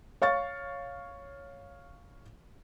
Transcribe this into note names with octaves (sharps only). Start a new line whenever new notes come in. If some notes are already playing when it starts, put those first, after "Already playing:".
C#5 F5 C#6 A6